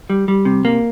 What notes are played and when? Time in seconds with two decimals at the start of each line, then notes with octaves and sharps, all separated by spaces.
0.10 G3
0.28 G3
0.45 C3
0.65 A#3